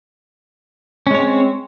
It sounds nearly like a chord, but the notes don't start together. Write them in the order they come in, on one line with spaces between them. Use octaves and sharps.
C#4 G#3 C#5 C4